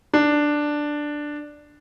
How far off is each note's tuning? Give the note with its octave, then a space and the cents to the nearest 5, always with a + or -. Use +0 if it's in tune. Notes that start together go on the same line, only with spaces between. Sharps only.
D4 +5